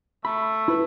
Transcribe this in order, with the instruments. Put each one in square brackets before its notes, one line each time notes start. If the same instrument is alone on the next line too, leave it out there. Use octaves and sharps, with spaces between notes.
[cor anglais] A3 [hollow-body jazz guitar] B5
[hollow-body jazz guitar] E4 B4